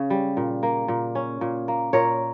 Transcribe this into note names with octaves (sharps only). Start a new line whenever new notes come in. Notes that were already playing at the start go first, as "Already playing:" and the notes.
Already playing: C#3 C#4
G3
A#2
A#3
A#2
C#4
A#2
A#3
A#2 A#4 C#5